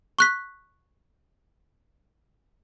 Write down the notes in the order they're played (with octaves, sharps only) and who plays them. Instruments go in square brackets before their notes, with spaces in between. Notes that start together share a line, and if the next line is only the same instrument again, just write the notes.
[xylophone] C#6 F#6 B6